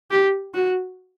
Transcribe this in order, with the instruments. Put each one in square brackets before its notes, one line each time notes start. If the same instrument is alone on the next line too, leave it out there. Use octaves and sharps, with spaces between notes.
[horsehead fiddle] G4
F#4